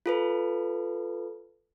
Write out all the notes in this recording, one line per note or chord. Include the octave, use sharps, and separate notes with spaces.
F4 A4 B4